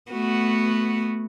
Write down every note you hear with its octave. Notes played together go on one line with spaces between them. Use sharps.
A3 B3 F#4